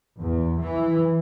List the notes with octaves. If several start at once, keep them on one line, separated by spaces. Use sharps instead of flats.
E2
E3